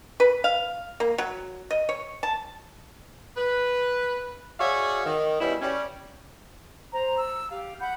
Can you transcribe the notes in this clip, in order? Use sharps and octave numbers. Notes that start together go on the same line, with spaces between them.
B4
F5
A#3
F#3
D#5
C#5
A5
B4
F#4 G#4 C#5 D5 E5 F5
D#3
B2 G3 C#4 E4
G3 C#4
C5 A#5
E6
G4 F5
F#5 B5 G6